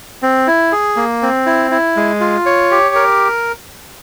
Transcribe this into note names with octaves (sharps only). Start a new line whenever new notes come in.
C4
E4
G#4
A#3
C4
E4
E4
G#3
F4
C#5
G4
A#4